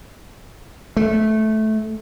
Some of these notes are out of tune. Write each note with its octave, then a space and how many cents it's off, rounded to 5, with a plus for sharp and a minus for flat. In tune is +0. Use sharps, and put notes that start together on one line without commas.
A3 -15